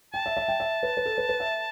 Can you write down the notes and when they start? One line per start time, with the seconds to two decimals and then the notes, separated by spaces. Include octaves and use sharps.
0.14 G5 A5
0.26 E5
0.37 E5
0.48 G5
0.60 E5
0.83 B4
0.97 B4
1.06 A4
1.18 B4
1.29 B4
1.40 E5